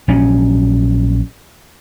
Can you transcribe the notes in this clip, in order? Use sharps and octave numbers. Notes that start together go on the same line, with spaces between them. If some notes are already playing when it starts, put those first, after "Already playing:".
A#1 F#3 C#4